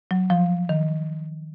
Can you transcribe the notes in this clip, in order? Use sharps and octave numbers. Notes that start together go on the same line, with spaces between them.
F#3
F3
D#3